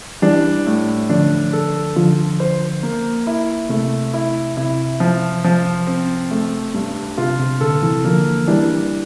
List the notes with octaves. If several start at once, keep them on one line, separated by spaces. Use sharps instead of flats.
E3 G3 D4
A2
D3 F3 D4
A4
D3 F3 F4
C5
A#3
E4
C3 A3
E4
C3 E4
F3
F3
C4
A3
G2
C3 F4
C3
A#2 D3 A4
C3 E3
D3 F3 A#3
E3 G3 D4